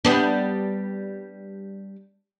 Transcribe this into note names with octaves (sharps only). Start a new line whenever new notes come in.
G3 B3 D4